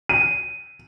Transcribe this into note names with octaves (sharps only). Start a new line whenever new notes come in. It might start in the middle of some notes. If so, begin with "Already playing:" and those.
D#7